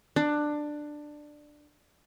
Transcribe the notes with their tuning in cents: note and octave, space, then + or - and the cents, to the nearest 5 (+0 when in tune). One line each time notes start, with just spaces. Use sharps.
D4 +15